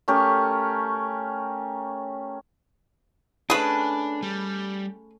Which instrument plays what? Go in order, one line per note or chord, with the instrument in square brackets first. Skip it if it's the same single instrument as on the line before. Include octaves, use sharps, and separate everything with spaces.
[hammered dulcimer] A3 C#4 G4 A#4
[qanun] A3 C#4 [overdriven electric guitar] D4 [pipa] G#4 B4
[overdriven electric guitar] G3